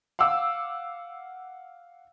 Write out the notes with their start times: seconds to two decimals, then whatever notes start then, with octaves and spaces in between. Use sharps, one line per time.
0.19 F5 F#5 D6 E6